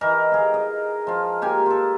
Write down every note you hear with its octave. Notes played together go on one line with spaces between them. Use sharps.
E3 D#4 A#4
G#4 F5
D#5
F3 F4
A#3 G4 A#4 G#5
F4 A4